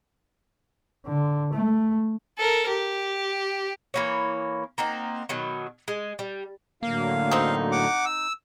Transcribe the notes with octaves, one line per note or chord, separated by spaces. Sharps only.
D3
A3
A4 A#4
G4
E3 A#3 C#5
A#3 C4 D#4 F#5
B2 D#3 F#3
G#3
G3
A2 D3 F#3 A#3 F5
C4 D#4
F#5 D6
E6